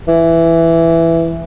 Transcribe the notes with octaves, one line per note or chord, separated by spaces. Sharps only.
E3